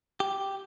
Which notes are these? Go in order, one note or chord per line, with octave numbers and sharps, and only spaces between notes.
G4